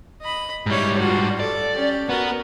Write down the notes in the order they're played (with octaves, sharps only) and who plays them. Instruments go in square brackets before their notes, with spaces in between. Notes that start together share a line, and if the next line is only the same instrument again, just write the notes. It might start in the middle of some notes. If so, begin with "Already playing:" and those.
[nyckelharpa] D#5 B5
[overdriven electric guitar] G#2 G3 [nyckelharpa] E4 C#5
[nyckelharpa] F4 F#4
[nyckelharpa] A4 [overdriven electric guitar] D5
[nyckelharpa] C#4 G4
[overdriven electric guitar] B3 [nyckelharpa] F#4 A#4